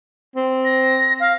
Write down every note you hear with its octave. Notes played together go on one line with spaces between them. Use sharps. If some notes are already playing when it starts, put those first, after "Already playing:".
C4
A#6
F5